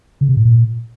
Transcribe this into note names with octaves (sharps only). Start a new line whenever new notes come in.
C#3
C3
A2
A#2